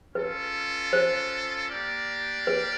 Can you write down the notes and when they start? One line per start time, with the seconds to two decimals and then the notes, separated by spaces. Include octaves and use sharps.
0.14 C#4 F4 A4 B4
0.93 C5
1.70 A#3 D4 G4 A#4 D5
2.47 B4